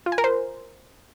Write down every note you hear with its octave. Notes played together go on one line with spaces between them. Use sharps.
F4
G#5
A#4
C5